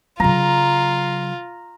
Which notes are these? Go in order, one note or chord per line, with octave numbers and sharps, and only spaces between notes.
C#3 F#3 F4 A#5